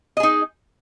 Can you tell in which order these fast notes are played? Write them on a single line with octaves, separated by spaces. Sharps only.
D#5 G#4 D#4